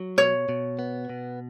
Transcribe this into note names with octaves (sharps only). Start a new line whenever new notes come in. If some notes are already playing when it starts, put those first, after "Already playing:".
Already playing: F#3
B2 C#5
B2
B3
B2